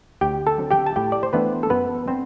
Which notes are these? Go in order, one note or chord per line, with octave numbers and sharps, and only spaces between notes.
D2 G4 G5
A4 A5
D3 F#3 C4
G4 G5
A5
A2 G4 G5
D5
C5
E3 A3 B3 D4 B4
A4
F#2 B3 B4
B3 C4 D4 C5